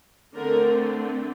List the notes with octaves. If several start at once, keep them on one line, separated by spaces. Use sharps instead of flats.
D3 A3 C4 A#4